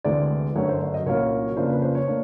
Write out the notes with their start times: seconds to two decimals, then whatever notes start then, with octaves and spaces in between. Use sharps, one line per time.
0.05 D2 C3 E3 G#3 D5
0.55 G1 F#2 D3 F#3 C#5
0.69 C5
0.81 D5
0.94 D#5
1.06 C2 A#2 F#3 A#3 C#4 C#5
1.57 F2 C#3 F3 A#3 D4 C5
1.70 B4
1.82 C5
1.95 C#5
2.08 A#3 D4